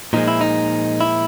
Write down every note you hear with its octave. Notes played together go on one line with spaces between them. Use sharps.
A#2 F3 G#3 D#4
E4
D#4
E4